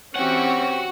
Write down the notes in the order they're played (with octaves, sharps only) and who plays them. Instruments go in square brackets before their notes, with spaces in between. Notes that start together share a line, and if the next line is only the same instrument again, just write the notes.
[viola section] E3 C4 C#4 [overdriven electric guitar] F#4 F#5 [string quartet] G4 C#6